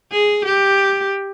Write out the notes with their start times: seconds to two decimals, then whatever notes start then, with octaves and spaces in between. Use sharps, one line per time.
0.12 G#4
0.45 G4